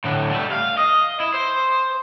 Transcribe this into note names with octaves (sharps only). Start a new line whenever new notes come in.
A2 D3
G3 A3
F5
D#5
E4
C5